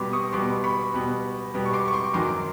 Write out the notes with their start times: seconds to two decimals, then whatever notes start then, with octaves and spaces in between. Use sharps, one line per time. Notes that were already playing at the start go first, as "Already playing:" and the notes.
Already playing: B2 G3 B3 C6 D6
0.12 C#6 D#6
0.33 B2 G3 B3 C6 D6
0.64 B5 C#6
0.94 B2 G3 B3
1.54 B2 G3 B3
1.66 C#6
1.73 C6 D6
1.88 C#6
1.93 C6 D6
2.14 F#2 D#3 F#3 C6 D6